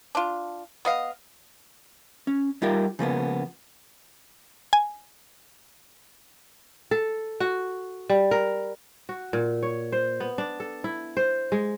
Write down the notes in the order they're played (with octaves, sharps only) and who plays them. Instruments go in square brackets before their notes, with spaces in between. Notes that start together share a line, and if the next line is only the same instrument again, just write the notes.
[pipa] D4 F4
B3 D#5 F5
[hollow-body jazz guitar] C#4
G3 D#4 F4 G4 A#4 E5
C#3 F3 A#3 B3
[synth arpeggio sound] G#5
[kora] A4
F#4
G3
A#4
F#4
A#2
C#5
C5
B3
D4
A4
E4
C5
G#3